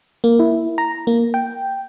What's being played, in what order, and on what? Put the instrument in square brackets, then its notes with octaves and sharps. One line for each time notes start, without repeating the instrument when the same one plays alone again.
[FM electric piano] A#3
E4
A#5
A#3
G5